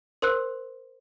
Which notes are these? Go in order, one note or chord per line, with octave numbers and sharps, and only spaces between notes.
A#4 C5 C6 E6 F#6